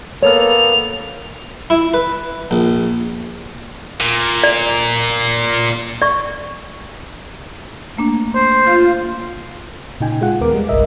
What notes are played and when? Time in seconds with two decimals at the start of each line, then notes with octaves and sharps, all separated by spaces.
0.23 A#3 B3 A4 C#5 F6 F7
1.70 E4
1.94 B4
2.51 A#1
4.01 A#2
4.43 D5
6.02 D5 C#6
7.97 A3 A#3 D4
8.35 C5
8.66 F4
10.00 A#2 C#3 D#4 G5 G#5
10.21 G#3 F4 F#5
10.40 D#2 B3 A#4 D6
10.54 G3 G#3
10.69 G1 C2 A#4 D#5 E5